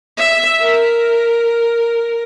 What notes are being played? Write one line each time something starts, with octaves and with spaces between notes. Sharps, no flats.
E5
A#4